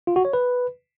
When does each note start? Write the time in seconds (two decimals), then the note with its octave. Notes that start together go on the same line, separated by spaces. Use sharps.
0.07 F4
0.16 F#4
0.25 C#5
0.33 B4